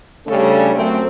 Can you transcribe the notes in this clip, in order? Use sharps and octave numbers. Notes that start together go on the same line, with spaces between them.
C#3 G3 A3 C#4 D4 A4
F#2 A3 C4